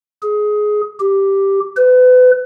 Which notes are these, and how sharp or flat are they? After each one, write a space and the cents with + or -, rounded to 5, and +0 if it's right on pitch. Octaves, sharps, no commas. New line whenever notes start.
G#4 +15
G4 +0
B4 +35